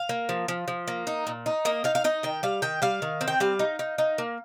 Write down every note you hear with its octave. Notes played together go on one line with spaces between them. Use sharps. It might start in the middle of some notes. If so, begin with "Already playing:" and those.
Already playing: F5
A#3
F3
F3
F3
A#3
D#4
A#2
D#4
A#3 D#5
D#4 F5
F5
D#4 D#5
D#3 G5
G3 F5
D#3 G5
G3 F5
D#3
C4
G5
G3 F5
D#4
D#4
D#4
A#3